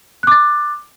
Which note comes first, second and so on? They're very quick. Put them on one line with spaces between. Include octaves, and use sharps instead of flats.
F#6 D6 A6